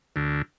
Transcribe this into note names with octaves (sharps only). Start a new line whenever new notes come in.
D2